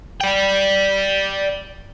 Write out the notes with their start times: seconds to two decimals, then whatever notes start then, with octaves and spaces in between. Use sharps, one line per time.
0.21 D5 G5